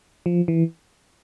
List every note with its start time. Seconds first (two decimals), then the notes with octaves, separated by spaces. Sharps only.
0.26 F3
0.48 E3